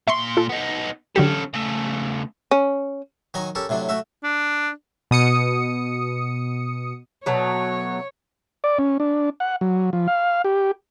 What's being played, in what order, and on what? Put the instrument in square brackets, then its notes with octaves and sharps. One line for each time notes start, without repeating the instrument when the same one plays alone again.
[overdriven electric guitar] A#2 C6 [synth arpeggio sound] E5 C#6 C7
[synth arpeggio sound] F4 A4
[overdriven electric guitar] B3 D#4
[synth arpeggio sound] D3 F#3 G4 [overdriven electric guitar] C#4 A4
[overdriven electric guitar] C#3 A3
[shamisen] C#4
[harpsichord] D#3 F#3 D#5 G#5 A#5
C#4 G4 A4 A#4
A2 C3 F#3 D4
A3 F#4 E5
[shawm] D4
[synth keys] B2 D#6 C#7
[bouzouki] B2 F#3 A3 [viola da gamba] C#5
[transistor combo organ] D5
C#4
D4
F#5
F#3
F3
F5
G4